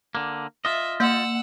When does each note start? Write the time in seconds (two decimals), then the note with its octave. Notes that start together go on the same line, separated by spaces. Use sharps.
0.15 D3 A#3
0.65 F4 D#5 E5
1.00 A#3 F#5 E6